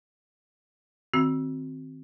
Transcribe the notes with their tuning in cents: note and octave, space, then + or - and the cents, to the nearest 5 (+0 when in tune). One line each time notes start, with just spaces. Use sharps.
D#3 +0 C4 +0 F#4 +0